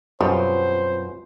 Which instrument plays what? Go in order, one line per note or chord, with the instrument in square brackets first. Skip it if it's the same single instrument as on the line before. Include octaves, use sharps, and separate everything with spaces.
[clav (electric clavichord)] F#2 B2 [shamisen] G3 [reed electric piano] C4 F4 B4 [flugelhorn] C5